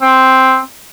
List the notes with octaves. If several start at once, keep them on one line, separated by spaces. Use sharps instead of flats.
C4